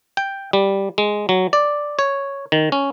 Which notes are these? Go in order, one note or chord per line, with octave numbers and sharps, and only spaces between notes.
G5
G3
G#3
F#3
D5
C#5
D#3
C#4